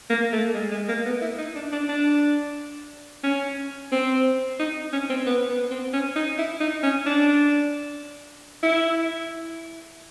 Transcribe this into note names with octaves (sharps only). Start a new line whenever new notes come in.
A#3
A3
G#3
G#3
A#3
B3
E4
D#4
D4
D4
D4
C#4
C4
D#4
C#4
C4
B3
B3
C4
C#4
D#4
E4
D#4
C#4
D4
E4